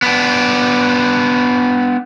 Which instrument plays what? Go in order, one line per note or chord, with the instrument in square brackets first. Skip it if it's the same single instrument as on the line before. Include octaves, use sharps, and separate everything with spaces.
[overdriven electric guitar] B3 D4